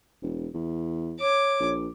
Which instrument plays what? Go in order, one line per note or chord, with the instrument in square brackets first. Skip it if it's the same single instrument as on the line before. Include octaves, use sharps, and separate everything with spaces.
[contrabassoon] E1
E2
[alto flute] C#5 [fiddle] D6
[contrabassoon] A#1